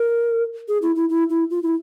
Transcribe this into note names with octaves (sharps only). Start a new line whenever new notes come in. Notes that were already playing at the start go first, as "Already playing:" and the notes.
Already playing: A#4
G#4
E4
E4
E4
E4
F4
E4